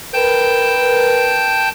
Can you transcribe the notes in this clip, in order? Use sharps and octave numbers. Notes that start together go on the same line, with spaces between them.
A#4 B4 G5 A5 G6